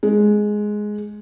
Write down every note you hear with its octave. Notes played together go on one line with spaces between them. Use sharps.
G#3